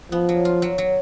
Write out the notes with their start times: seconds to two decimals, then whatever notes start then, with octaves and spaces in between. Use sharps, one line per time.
0.12 F3 B3
0.29 F#3
0.45 F4
0.62 F#3
0.78 F#3